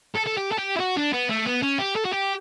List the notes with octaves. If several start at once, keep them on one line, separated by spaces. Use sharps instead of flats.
A4
A4
G4
A4
G4
E4
F#4
D4
B3
A3
B3
C#4
G4
A4
F#4
G4